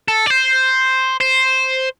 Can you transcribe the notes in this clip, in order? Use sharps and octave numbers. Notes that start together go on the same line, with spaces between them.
A4
D5
C5
C5